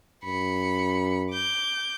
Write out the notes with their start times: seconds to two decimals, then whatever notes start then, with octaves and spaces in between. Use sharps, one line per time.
0.25 F#2 B5 C#7
1.31 D6 G6